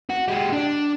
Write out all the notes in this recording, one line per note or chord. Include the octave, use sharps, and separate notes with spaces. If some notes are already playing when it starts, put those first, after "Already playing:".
F#4
G#3 G4
D4